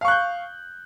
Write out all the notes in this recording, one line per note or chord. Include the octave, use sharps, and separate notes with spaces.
F5 C#6 F#6 G6